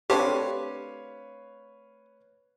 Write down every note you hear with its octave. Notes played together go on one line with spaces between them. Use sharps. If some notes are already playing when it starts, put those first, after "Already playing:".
A3 C4 D4 G4 B4 C#5 F5